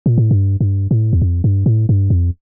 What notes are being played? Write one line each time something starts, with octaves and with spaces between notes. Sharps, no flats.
A#2
A2
G2
G2
A2
E2
F2
G2
A2
G2
F2